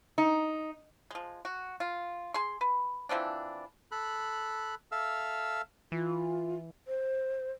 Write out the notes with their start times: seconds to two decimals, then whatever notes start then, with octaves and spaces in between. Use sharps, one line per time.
0.18 D#4
1.11 F3 G#3
1.45 F#4
1.80 F4
2.34 G#4 C6
2.61 B4
3.09 E3 F3 C4 D4
3.92 A4 B5 F#6
4.92 A4 E5 F5 E6 F6
5.92 E3 F4
6.88 C5